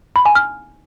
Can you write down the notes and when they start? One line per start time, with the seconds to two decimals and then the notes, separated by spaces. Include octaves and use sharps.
0.16 B5
0.26 G#5
0.35 F6